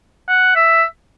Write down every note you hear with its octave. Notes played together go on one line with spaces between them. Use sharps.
F#5
E5